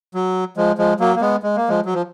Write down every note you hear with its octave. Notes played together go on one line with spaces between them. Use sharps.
F#3
F3 G#3
F3 G#3
F#3 A#3
A#3
G#3 B3
G#3
A#3
F3 G#3
F#3
F3